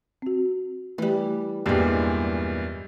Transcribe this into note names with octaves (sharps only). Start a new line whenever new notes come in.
C4 F#4
E3 G3 A3
E2 G2 A#2 G3 G#3